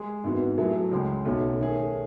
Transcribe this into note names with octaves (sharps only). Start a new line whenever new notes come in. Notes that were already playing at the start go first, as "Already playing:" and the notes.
Already playing: G#3 G#4
G#1 G#2 E3 B3 F#4
A2 F#3 A3 E4 G#4
C#2 C#3 G#3
B1 B2 A3 C#4 F#4
D#3 A3 C#4 G#4